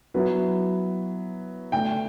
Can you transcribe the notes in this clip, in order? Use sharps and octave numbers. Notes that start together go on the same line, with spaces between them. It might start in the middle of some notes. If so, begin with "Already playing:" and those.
F#3 B3 E4 B4
D3 A3 D4 G5